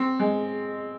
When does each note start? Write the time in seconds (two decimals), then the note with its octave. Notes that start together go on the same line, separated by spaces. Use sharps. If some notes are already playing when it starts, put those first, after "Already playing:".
Already playing: C4
0.20 G#3